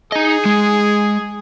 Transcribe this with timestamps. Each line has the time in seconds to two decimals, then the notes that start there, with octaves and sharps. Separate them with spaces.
0.12 D#4 G#4 D#5
0.45 G#3